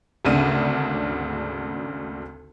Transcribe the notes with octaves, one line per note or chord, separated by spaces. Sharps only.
G#1 D2 C#3 D4 D#7